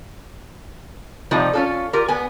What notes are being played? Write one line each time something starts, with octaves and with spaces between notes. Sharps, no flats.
C3 F3 G3 A3 D#4 F4
C#4 F4 A4
F4 G4 A#4
B3 G#5